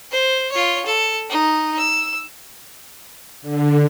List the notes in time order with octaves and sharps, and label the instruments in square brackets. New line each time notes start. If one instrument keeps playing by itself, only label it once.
[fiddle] C5
F4 C#5
A4
D#4
E6
[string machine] D3